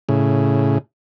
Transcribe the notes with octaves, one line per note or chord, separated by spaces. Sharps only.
A2 C#3